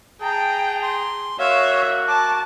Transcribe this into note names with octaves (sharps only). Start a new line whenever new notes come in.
G#4 G5 A5 A#5
C6
A#3 F#4 C#5 E5 F5
A5 D6